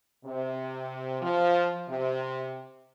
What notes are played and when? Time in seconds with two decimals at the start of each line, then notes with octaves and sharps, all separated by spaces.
0.25 C3
1.22 F3
1.89 C3